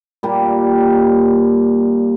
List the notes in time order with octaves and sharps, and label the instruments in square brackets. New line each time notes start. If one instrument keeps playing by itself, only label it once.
[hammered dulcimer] A#2 G3 A#3 G4